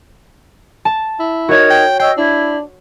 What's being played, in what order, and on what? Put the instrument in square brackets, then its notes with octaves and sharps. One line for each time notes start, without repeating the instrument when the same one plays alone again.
[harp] A5
[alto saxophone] E4
[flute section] D#4 A#4 G#6 [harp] F#4 C#5
[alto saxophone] G5
[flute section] C#5 D#5 E6 [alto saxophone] G5 [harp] C7
[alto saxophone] D4 [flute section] E4